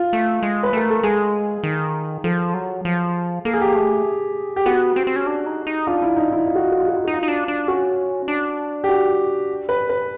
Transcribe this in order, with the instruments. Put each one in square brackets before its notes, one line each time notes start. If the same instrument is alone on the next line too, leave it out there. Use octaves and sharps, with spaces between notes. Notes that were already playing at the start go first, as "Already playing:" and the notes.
Already playing: [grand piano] F4
[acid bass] A3
G#3
[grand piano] B4
[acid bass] A3 [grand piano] A#4
[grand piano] A4
[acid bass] G#3 [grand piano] G#4
[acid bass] D#3
[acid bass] F3 [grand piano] A4
[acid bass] F#3
F3
[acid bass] A#3 [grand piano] A4
[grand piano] G#4
G4
G#4
[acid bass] A3
[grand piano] G4
[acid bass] B3 [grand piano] F#4
[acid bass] C4
C4
C#4
D4
D#4
D#4
[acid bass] D4 [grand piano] F4
[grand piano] E4
D#4
E4
F4
F#4
F4
F#4
F4
F#4
F4
[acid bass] D#4 [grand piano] F#4
[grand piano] F4
[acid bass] D#4
D4
D4
[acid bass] C#4 [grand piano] F#4
[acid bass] D4
[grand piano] G4
F#4
B4
B4